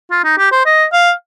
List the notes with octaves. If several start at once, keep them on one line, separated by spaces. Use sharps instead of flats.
F4
D#4
G4
C5
D#5
F5